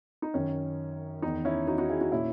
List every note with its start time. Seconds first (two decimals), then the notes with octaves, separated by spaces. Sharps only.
0.22 D#4
0.34 F#2 D#3 C#4
1.22 E2 D#3 D#4
1.45 C#4 E4
1.67 D#4 F#4
1.78 D#4 F#4
1.89 E4 G#4
2.01 D#4 F#4
2.11 A#2 C#4 E4